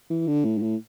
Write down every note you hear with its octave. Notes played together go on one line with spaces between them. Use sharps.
E3
D3
A2
G#2
A2